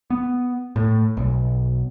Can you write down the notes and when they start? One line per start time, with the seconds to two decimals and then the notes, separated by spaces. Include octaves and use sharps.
0.10 B3
0.76 A2
1.17 B1